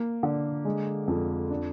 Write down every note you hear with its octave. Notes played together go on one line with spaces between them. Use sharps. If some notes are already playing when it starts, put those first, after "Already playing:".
Already playing: A#3
D3
G#3
F2
D4